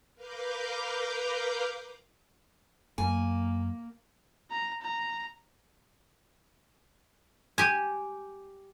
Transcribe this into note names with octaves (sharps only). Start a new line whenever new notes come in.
A#4 B4 F5 A#5 D6 G6
F#2 A#3 G#5
A#5
A#5
G4 G#5